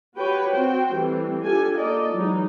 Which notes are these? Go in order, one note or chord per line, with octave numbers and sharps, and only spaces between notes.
F#4 G4 B4 C#5 G5
C4 F#4 C5 G5
E3 G3 A3 C4
D4 F4 G4 A4 G#5
A#3 D#4 F4 A4 D5 D#5
E3 F#3 G#3 D#4